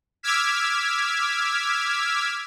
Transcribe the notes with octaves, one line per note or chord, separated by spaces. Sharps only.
D6 E6 F6 G#6 B6